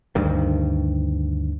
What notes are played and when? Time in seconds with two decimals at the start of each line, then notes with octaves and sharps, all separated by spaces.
0.15 D2 G2 D#3